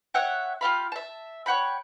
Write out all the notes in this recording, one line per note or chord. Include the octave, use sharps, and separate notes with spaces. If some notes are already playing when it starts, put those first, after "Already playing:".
C#5 E5 F#5 G5
F4 G4 F5 B5
E5 A5
C#5 F#5 G5 B5